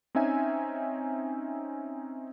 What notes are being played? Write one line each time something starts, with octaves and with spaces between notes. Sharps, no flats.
C4 C#4 D#4 E5 G#5